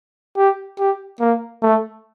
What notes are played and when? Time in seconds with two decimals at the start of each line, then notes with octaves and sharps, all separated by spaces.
0.37 G4
0.79 G4
1.20 A#3
1.62 A3